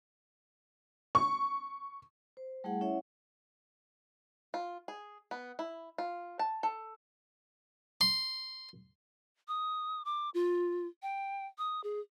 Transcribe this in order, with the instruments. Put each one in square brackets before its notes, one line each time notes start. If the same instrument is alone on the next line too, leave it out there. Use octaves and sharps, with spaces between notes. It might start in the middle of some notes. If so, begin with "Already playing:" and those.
[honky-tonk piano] C#6
[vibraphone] C5
G3 A3 E4 G#4 F#5
C#4 E4 C#5 E5 F#5
[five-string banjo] F4
G#4
B3
E4
F4
A5
A4
[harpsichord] C6
[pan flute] D#6
D6
F4
G5
D#6
G#4